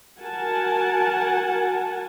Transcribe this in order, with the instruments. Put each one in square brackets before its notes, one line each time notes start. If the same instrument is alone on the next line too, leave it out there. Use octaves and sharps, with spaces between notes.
[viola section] F#4 A#4 F#5 G#5 A5